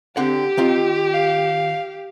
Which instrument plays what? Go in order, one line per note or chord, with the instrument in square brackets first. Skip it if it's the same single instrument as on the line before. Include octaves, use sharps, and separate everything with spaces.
[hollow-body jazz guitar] D3 C4 F#5 [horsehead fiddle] G4
[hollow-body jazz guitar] D#3 C4 F4
[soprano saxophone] F5